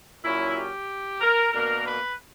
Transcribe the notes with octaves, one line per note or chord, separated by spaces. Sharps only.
A#2 F#3 C#4 E4
G4
A#4
B2 A#3 D4 A#4
B4